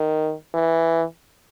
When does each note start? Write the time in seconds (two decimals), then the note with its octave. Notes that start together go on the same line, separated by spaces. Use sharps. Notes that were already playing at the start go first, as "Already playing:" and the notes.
Already playing: D#3
0.54 E3